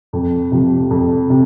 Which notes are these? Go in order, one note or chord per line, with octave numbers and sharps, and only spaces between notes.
F2
C3 F3
F2
C3